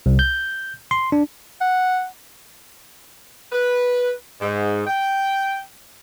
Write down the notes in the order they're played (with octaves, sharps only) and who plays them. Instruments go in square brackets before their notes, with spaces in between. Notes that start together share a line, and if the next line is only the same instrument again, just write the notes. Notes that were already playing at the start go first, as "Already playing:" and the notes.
[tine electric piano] C2
G6
C6
D4
[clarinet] F#5
[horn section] B4
G#2
G5